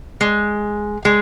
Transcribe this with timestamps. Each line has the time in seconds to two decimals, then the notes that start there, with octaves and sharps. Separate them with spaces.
0.21 G#3
1.05 G#3